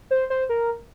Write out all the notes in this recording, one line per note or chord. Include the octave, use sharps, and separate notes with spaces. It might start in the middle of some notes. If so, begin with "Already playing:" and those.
C5
C5
A#4